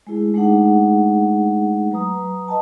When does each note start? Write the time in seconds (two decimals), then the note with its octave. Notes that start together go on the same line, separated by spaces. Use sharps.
0.07 G#3 A3 E4 G#4
0.34 G#3 A3 D4 D#4 G#4 F#5
1.92 F#3 B4 A#5 D#6
2.48 B4 D#5 G5 A5